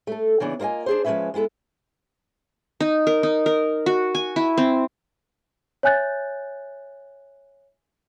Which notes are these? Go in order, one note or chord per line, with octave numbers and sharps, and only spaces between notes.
A3 A4
C#3 E3 B3 D4
A#3 F4 C#5 D#5 G#5
D4 G#4 C5
F3 G#3 C4 C#4 B4 E5
G#3 B3 E4 A4
D#4
A#4
D#4
A#4
F#4
G#5
E4
C4
C#5 E5 G#5 F#6 G6 A6